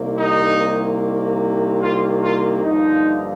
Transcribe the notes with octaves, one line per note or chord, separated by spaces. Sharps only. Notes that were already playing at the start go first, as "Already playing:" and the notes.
Already playing: C2 C3 D#3 A#3
D#4
F4
F4
G2 D3 F3 A#3 D#4